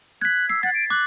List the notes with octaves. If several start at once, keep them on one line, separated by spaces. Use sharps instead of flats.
F#6 G#6 B6
E6 C7
F#5 A6
D7
D6 F#6